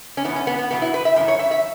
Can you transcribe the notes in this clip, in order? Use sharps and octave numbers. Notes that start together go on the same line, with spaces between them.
C#4
E2 E3 B3
C#4
B3
B3
E2 B2 F#3 B3
E4
B4
E5
F#2 E3 E5
C#5
E5
E5